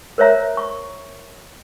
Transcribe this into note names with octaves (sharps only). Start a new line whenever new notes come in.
A#4 C5 C#5 E5 A#5
C#6